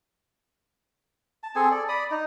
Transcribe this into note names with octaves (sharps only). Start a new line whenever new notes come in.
A5
C4 G#4 A4 G#5
A4 D5
D5 B5 D#6
D#4